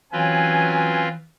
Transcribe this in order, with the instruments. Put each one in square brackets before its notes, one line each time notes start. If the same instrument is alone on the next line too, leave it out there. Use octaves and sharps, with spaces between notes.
[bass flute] E3 [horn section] F#3 C#4 G#5 [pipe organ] C4 F4 B4